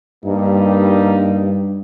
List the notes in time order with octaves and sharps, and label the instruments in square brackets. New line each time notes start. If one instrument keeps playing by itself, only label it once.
[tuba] G2 [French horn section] G3 A#3 D#4